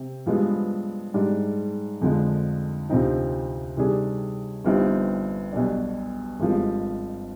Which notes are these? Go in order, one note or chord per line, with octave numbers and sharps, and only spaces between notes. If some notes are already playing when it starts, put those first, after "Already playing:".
Already playing: C3 C4
G2 F3 G#3 B3
G#2 G3 D4
F2 D3 F3 G#3
D2 C3 F3 C4 D#4
C3 D#3 G3 D4 G#4
G1 G2 F3 C4 D#4
B1 B2 G3 D4
G#1 G2 F3 G#3